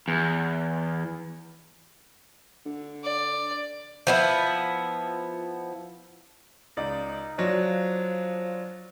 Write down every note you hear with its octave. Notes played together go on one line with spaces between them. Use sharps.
E2
D3
D5
F3 B3 E4
C#2 D#4 D5
F3 F#3 D4 F4